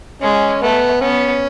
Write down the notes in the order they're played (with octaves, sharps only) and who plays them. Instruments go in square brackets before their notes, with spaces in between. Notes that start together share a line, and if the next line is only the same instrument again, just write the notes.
[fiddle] G#3 [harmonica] C#4
[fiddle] A3 [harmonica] B3
[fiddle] B3 [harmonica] C#4